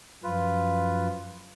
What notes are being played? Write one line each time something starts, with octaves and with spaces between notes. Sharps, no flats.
F#2 F3 F4 B4